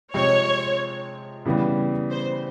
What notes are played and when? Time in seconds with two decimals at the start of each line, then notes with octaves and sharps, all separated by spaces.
0.14 C3 F3 G#3 C4 F4 C#5
1.45 C#3 E3 G3 B3
2.11 C5